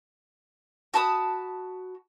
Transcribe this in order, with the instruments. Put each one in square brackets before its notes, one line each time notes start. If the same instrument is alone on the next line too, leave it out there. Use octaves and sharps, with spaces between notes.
[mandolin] F#4 A5 B5 D#6